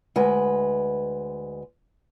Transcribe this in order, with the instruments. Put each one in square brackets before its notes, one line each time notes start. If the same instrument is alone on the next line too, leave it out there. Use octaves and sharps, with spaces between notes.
[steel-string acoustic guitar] D2 G#3 B4